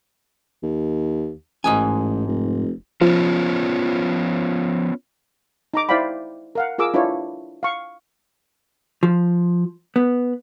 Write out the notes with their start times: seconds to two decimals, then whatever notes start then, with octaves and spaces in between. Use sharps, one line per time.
0.63 D#2
1.64 A1 G#2 D#5 G#5
2.27 F1
3.01 F3 B3 C#4 F4
5.74 D#4 A#5 D6
5.89 E4 C5 D5 F5 G5 B5
6.55 A#4 F5 F#5
6.78 F4 G#4 A#4 D6 E6
6.94 D4 E4 F4 B4 C#5
7.63 F5 C#6
9.03 F3
9.96 B3